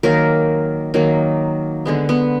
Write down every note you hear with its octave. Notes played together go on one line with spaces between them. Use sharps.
D#3 F#3 A#3 A#4
D#3 F#3 A#3
D3 G#3 B3
B3